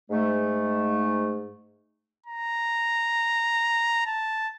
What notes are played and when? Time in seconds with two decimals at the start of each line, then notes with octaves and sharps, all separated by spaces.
0.10 G#2 A3
2.26 A#5
4.06 A5